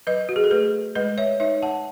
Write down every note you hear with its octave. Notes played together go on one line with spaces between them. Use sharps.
F#3 B4 D#5
F#4
G#4
A4
A3 G#4 B4
G#3 B4 D#5
C#5 E5
D#4 C#5 E5
F#5 A5